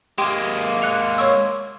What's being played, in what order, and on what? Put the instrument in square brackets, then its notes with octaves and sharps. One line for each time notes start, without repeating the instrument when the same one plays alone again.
[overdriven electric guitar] G#3 A#3 [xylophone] G4 G5
[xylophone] F#6 C#7 F7
C#5 C#6 E6